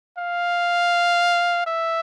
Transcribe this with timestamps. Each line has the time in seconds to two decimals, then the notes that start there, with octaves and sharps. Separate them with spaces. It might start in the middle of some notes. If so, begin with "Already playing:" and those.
0.18 F5
1.66 E5